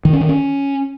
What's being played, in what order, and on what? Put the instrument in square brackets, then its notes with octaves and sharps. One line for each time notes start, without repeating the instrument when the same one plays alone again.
[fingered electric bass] D#3
C#4
D#3
C#4